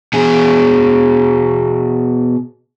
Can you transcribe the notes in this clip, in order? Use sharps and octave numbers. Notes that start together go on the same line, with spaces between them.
B2 G#4